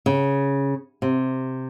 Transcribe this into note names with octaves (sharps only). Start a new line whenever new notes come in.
C#3
C3